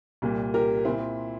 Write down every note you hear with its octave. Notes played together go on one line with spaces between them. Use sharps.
C2 A#2 G3 A#3
G4 A#4
A#2 C4 E4